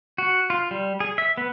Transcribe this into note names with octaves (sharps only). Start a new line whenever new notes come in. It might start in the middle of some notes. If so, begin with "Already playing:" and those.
F#4
F4
G3
G#4
E5
B3